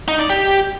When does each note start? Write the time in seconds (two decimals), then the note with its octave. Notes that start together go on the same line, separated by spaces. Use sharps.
0.08 D#4
0.19 D5
0.30 G4